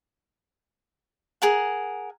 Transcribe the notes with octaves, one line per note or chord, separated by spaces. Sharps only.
G#4 A#4 F#5